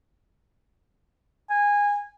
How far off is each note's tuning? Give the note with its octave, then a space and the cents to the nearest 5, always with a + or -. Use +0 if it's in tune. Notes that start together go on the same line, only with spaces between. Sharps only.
G#5 -20